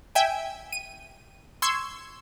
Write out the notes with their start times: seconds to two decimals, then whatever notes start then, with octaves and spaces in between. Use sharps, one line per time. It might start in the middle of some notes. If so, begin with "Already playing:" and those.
0.15 E5 G5 G#5
0.72 D#7
1.62 C6 C#6 E6 G#6